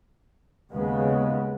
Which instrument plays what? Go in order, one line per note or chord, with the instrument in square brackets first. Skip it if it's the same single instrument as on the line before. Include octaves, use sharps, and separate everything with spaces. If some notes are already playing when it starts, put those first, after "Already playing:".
[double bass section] D#2 C#3 G#3 B3